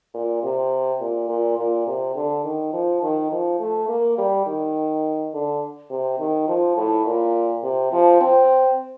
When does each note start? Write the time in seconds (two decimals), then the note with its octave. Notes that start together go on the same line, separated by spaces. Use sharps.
0.14 A#2
0.43 C3
1.00 A#2
1.29 A#2
1.57 A#2
1.87 C3
2.15 D3
2.44 D#3
2.73 F3
3.02 D#3
3.31 F3
3.60 A3
3.89 A#3
4.18 G3
4.46 D#3
5.33 D3
5.90 C3
6.19 D#3
6.48 F3
6.77 A2
7.06 A#2
7.64 C3
7.92 F3
8.21 C4